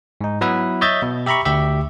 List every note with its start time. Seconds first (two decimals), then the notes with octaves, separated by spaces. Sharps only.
0.21 G#2 D#4
0.41 F#3 B3 E4 B4 E5
0.81 C#5 D#5 E5 G6 A6
1.02 B2
1.26 G4 E5 A#5 B5 C#6
1.45 D2 G4 E5